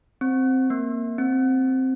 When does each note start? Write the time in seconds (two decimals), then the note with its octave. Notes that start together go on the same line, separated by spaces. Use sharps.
0.21 C4
0.70 A#3
1.18 C4